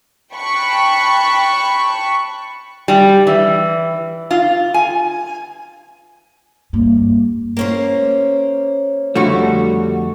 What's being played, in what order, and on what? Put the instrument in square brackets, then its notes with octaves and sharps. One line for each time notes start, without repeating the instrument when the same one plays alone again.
[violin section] G5 A5 B5 C#6 F#6
[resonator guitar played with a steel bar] G3
E3
F4
G#5
[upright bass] G2 A#3
[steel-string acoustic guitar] A#3 C#4 C5
[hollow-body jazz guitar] F2 D3 A3 [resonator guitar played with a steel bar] G3 F#4